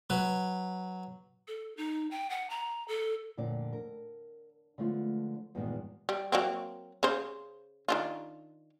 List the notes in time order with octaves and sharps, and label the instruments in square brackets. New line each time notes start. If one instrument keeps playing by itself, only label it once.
[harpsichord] F#3 B4
[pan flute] A4
D#4
G5
F#5
A#5
A4
[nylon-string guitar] F2 A#2 D3 D5
A#4
D3 F3 G#3 A3 B3 F4
E2 G2 A#2 D#3 G#3 B3
[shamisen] G3
F#3 A#3 C4
C#3 C5
D#3 D4 F4